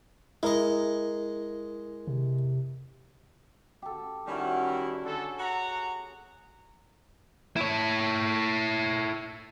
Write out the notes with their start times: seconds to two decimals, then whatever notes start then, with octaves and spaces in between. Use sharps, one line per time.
0.43 G#3 E4 A#4 D#5
2.07 C3
3.82 G4 A4
4.27 D#3 G3 C#4 E4 F#4
4.70 G#4
5.05 D3 A4
5.39 F#4 F#5 A#5
7.56 E4 C#5